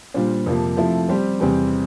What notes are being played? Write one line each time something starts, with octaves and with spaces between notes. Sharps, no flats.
A#2 G3 D4 F4 C5
F2 C3 F3 A#3
C3 F3 A3 E4
G3 C4 G4 C5
E2 C3 G3 C4 G4